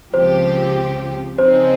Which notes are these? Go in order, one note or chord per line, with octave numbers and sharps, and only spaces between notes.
C#2 C#3 F3 C4 G4 C5
C#3 F3 C4 D#4 G#4 C5